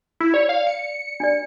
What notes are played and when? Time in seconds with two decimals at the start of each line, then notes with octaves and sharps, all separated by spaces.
0.20 E4
0.34 C#5 D5
0.49 F5
0.67 C#7
1.20 D4 D5